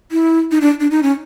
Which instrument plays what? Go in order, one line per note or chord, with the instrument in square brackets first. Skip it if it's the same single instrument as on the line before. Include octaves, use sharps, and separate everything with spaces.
[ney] E4
D#4
D4
D4
D#4
C#4